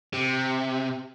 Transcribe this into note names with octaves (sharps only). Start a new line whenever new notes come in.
C3